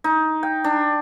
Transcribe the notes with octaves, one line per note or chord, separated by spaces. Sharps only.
D#4
G5
D4